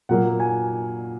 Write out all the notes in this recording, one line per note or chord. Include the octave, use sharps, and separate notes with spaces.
A#2 F#3 A#3 F#5
G#5